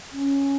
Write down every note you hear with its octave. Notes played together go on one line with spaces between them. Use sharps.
C#4